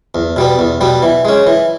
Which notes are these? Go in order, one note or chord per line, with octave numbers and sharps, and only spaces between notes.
E2
B2 G3 B3
E2
B2 G3 B3
E3
G#3 C#4
E3